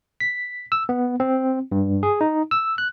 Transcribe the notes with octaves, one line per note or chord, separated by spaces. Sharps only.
B6
E6
B3
C4
G2
G#4
D#4
E6
F#6